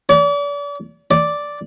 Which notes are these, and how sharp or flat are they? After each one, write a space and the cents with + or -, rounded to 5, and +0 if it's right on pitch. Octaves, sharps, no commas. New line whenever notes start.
D5 -40
D5 -5